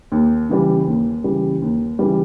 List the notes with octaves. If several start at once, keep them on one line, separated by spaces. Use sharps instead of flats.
D#2
C#3 E3 G3
D#2
C#3 E3 G3
D#2
C#3 E3 G3